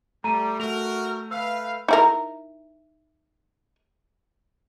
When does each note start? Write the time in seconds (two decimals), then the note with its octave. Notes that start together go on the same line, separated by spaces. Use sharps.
0.24 G3 A3 A#5 D#7
0.60 A3 F#4 A#4 F7
1.31 B4 F5 E6
1.88 D#4 E4 A#4